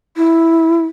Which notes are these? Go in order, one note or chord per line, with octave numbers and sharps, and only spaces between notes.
E4